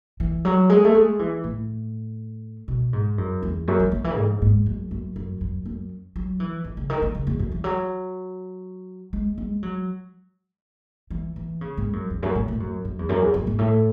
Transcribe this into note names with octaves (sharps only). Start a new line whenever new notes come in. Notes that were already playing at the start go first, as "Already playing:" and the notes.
E3
F#3
G#3
A3
G#3
E3
A2
B2
G#2
F#2
E2
F#2
E3
D#3
E3
G#2
G#2
F#2
F#2
F#2
F#2
F#2
F#3
E3
D#3
C#3
D#3
D#3
C#3
E2
F#2
E3
F#3
G#3
G#3
F#3
E3
E3
C#3
G#2
F#2
E2
F#2
A2
A2
F#2
F#2
E2
F#2
E2
F#2
G#2
A2